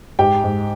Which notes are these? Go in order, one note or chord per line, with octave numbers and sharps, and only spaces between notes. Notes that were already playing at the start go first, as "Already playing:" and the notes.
G#2 G4 G5
G#2